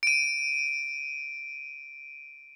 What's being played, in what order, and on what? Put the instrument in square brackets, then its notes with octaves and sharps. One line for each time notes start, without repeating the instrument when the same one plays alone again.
[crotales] D7 D#7